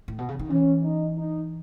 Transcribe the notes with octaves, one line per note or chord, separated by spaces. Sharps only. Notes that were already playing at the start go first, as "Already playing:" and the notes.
A2
B2
C#3
D#3
E3 C#4
D#4
D#4